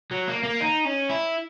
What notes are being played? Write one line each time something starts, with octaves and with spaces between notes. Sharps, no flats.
F#3
A#3
A#3
D#4
C#4
E4